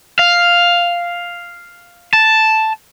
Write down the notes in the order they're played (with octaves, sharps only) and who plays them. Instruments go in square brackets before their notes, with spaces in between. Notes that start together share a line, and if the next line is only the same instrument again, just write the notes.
[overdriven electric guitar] F5
A5